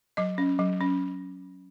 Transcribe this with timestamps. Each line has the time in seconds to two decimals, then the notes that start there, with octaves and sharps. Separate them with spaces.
0.17 F#3 D#5
0.38 C#4
0.59 F#3
0.81 C#4